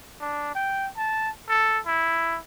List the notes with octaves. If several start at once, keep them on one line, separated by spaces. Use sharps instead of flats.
D4
G5
A5
A4
E4